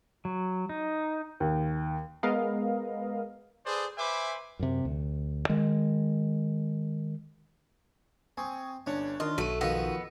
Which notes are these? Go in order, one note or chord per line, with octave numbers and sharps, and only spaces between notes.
F#3
D#4
D#2
G#3 B3 A#4 D#5 F5
G#4 A4 B4 C5 D5
B4 C5 E5 G#5 B5 D6
F#2 C3
D2
D#3 G#3
C4 G#5 C#6 D#6
G1 C#4 D4 C#5
D#3 D4 F4 D#5
B1 A3 F#4 D#7
D#3 F3 B3 F#4 D#5 E6 A#6